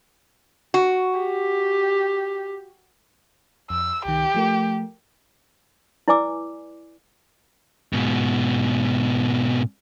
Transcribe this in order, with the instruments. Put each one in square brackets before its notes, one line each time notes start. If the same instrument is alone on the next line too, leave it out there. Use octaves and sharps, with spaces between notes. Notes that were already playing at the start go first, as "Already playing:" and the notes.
[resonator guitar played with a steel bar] F#4
[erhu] G4
[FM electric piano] F2 [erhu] E6
[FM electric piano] C2 D#3 [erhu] G4
[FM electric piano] F3 A3 A#4
[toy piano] E4 B4 D5 G#5 D6 E6
[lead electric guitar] G#2 B2